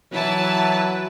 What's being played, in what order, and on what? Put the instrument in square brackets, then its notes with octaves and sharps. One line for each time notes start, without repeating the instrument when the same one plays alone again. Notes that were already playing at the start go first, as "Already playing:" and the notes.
[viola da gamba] E3 B4 [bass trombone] F#3 [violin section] E4 A5